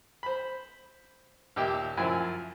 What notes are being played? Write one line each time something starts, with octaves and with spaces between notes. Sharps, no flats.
C5 B5
D#2 A#2 G4 E5 G5 E6
F#2 F3 E4 G#5